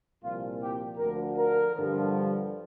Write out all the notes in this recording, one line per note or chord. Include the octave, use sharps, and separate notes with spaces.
C2 A#2 F3 F4
G4
D2 D3 F3 A#4
A#4
G2 D3 F3